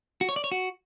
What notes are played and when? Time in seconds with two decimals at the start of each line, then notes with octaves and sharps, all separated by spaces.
0.21 F#4
0.29 C#5
0.36 D5
0.44 C#5
0.52 F#4